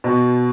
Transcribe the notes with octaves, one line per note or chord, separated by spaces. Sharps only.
B2